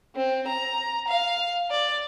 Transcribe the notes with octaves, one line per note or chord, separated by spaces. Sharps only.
C4
A#5
F5
D5